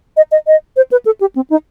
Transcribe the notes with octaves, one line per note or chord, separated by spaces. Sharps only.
D#5
D#5
D#5
C5
B4
A4
G4
C4
D#4